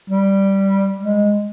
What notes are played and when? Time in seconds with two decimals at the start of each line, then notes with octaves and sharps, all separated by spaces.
0.10 G3
0.99 G#3